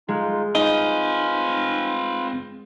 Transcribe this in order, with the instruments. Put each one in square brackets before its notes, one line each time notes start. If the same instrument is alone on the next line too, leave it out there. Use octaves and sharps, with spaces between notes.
[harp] G#3 [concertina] D#4 F4
[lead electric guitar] C4 G#5 [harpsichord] D#4 [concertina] F4 B4 C5